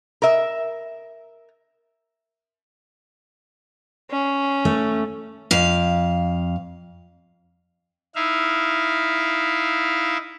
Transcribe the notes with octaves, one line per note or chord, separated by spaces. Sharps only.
A#4 E5
C#4
A3
F2 F5
D#4 E4 E5 F5